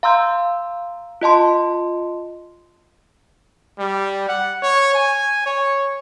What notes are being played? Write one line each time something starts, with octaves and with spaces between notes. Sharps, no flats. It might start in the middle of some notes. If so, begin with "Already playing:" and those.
F5 A#5 C6 E6 G6
F4 D#5 A5 C6
G3
F#5
C#5
G#5
C#5